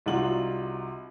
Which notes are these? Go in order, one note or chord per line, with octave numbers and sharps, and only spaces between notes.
C2 D#4 F4 F#4 F#7